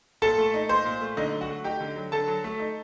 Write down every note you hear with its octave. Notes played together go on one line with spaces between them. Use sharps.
A#2 A4 A5
A3
D#4
A#2 C5 C6
A#2
A3
D3 D#4 D#5
F#3
F#4 F#5
A3
D#4 G4 G5
D3
F#3
D3 A4 A5
F#3
A3
D#4